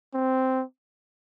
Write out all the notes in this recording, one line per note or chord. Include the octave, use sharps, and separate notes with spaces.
C4